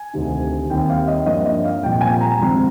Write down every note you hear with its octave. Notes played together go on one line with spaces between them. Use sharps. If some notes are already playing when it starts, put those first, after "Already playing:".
Already playing: G#5
D2 C3 D#3
D#2 D#3 G3 C4 G5
F5
D#5
G2 F3 A#3 D4 D#5
D#5
F5
C2 A#2 F3 G5
G#5
A#5
G#1 G2 D3 F3 C4